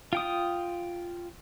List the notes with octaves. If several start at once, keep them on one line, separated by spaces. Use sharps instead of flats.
F4 G5 D#6